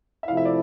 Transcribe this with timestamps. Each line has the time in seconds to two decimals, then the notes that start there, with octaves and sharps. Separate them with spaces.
0.23 E5
0.28 C3 F3 A3 E4 F5
0.37 E5
0.45 D5